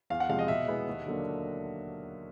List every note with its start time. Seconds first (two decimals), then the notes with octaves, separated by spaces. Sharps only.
0.10 E2 F5
0.20 F#5
0.29 C3 F3 G#3 F5
0.39 D#5
0.48 B2 E5
0.68 G#3 B3 E4 G#4
0.87 D#2
1.07 D3 F#3 A#3 D4